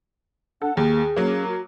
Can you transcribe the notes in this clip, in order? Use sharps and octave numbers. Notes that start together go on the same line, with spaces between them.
D4 A4 F#5
D#2 A#3 G#4
F#3 A#3 C#4
F#4